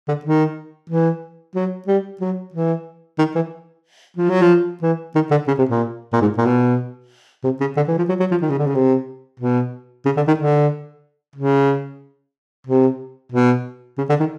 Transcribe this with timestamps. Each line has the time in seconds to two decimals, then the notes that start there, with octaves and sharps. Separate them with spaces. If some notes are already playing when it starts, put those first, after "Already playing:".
0.08 D3
0.25 D#3
0.90 E3
1.55 F#3
1.88 G3
2.21 F#3
2.54 E3
3.18 D#3
3.35 E3
4.17 F3
4.29 F#3
4.42 F3
4.82 E3
5.15 D#3
5.31 D3
5.48 C#3
5.59 C3
5.70 A#2
6.13 A#2
6.22 G#2
6.37 A#2
6.46 B2
7.44 C3
7.60 C#3
7.77 D3
7.88 E3
7.98 F3
8.09 F#3
8.20 F#3
8.31 F3
8.42 D#3
8.50 C#3
8.58 D3
8.67 C#3
8.75 C3
9.40 B2
10.06 C#3
10.17 D3
10.27 D#3
10.38 D3
11.36 C#3
12.67 C3
13.32 B2
13.98 C#3
14.09 D3
14.20 D#3